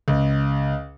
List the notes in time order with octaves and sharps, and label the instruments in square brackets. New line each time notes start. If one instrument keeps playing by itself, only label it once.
[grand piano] C#2